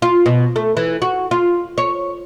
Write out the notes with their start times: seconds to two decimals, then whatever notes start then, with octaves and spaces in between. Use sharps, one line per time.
0.02 F4
0.26 B2
0.56 A3
0.77 E3
1.02 F#4
1.31 F4
1.78 C#5